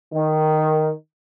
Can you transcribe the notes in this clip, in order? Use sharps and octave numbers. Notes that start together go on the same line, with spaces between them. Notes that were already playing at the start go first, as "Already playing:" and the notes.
D#3